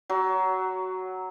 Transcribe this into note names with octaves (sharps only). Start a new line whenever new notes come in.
F#3